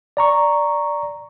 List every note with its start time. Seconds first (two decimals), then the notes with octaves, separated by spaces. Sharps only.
0.17 D5 A#5 C#6